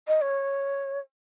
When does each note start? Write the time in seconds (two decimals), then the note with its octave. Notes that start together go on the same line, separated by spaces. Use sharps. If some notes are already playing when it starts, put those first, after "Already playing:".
0.08 D#5
0.21 C#5